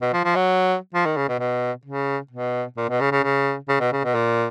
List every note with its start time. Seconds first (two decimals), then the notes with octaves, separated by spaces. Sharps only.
0.02 B2
0.13 F3
0.25 F3
0.36 F#3
0.94 F3
1.06 D#3
1.17 C#3
1.29 B2
1.39 B2
1.85 C#3
2.31 B2
2.77 A#2
2.89 B2
3.01 C#3
3.11 C#3
3.23 C#3
3.69 C#3
3.80 B2
3.92 C#3
4.04 B2
4.15 A#2